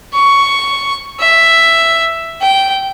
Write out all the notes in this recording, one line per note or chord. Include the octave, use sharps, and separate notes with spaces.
C#6
E5
G5